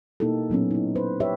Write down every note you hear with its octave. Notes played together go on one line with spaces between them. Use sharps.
B2 A#3 D#4 E4 G4 A4
A#2 F#3 B3 C#4
D#4 E4
B4 C5
G4 B4 C#5 E5